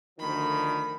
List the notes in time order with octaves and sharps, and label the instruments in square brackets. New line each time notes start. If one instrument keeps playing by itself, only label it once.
[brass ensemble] D2 F3 [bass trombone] D#3 [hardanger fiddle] B5